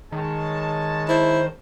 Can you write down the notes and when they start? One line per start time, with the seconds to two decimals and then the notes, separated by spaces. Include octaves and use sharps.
0.12 D#3 G#3 C#5 A5
1.08 E4 C5